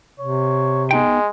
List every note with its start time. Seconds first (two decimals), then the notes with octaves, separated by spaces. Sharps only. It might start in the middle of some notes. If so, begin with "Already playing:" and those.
0.20 C3 C#5
0.91 G#3 B3 D#4 G5